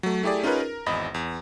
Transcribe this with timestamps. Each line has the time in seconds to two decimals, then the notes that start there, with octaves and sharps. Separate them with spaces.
0.03 F#3 A3
0.23 A3 E4 G4 G#4 D5
0.43 C#4 D#4 F4 G#4 A#4 B4
0.60 A#4
0.86 G#1 E2 D#5 B5 A#6
1.14 E2